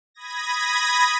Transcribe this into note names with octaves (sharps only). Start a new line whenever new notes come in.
B5 D#6 G#6 A#6